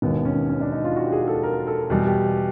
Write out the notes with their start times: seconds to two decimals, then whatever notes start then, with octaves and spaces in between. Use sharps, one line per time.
0.02 E1 D#2 D#3 B3
0.25 C#4
0.49 C#4
0.61 D4
0.72 D#4
0.84 F4
0.96 F#4
1.06 G4
1.12 G#4
1.28 A4
1.43 A#4
1.67 A4
1.90 E2 B2 G3
2.06 G4